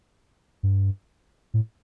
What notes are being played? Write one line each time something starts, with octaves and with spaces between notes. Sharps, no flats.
G2
A2